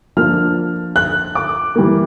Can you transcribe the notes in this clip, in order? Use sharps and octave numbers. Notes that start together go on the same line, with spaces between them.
F3 A#3 D4 F6
F#6
D6
E3 G3 A#3